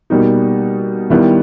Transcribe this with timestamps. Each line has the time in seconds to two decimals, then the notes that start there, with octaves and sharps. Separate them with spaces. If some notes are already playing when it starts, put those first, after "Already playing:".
0.10 B2 G3 A#3 D#4
1.10 D#3 G3 B3 E4